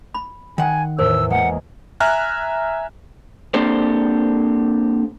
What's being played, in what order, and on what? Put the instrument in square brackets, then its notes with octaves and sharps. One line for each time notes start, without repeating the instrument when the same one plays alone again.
[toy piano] B5
[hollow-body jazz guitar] D#3 F#5 [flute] G#5
[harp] E2 A2 [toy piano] A#4 C5 [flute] E6
[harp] G#3 A#3 [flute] F#5
[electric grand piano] E5 G#5 A#5 F6 F#6
[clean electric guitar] A#3 C4 D4 G4 A4 C5